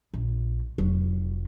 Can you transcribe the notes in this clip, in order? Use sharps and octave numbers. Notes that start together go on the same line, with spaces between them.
A#1
F1 F#3